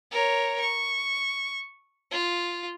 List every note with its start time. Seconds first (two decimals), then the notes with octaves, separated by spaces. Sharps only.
0.12 A#4 C#5
0.60 C#6
2.11 F4